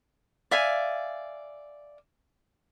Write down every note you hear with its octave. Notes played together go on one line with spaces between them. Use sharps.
D5 E5 F5 G#5